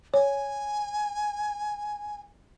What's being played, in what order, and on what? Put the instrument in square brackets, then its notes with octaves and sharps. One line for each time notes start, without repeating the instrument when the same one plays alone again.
[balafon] C#5 [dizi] G#5